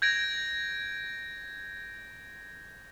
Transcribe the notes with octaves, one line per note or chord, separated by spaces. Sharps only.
G6 G#6 A#6 D7